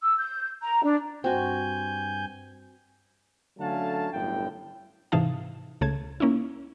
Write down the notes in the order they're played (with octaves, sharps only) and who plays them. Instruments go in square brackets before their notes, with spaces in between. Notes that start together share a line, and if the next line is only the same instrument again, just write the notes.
[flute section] E6
G6
A#5
D4
[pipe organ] G2 G#5 G6 [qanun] C4 F#4
[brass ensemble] D3 F#3 A3 C#4 F5 A5
G1 F#2 A2 G5
[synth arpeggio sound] G#2 C3 E3 D#4 F5 A5
C#2 C#3 A3 A5 G#6
A#3 C#4 D#4 E4